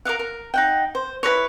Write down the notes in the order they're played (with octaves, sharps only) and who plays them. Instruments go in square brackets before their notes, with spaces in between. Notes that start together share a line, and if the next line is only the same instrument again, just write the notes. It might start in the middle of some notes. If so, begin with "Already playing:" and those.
[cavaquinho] A#4 D#5 F5 F#5
A#4
D#4 F#5 G5
C5
E4 A#4 B4 C#5